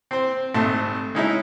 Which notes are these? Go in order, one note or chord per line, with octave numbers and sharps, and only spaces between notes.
C4 C5
G#1 C3 A3 A5
G#3 C#4 D#4 E4 C#5 E5